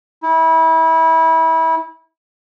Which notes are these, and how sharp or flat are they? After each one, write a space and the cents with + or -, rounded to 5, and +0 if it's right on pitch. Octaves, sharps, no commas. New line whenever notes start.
E4 -30